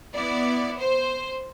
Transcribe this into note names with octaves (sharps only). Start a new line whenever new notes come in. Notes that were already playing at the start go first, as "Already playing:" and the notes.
B3 E4 D5
C5